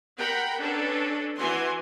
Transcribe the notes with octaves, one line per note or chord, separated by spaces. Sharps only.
A#4 F#5 G5 B5
C#4 D4 A4 B4
E3 E4 F#4 G#5 C6